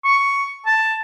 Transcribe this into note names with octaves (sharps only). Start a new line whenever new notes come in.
C#6
A5